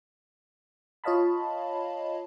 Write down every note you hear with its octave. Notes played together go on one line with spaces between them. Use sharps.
F4 C#5 D#5 F5 A5 B5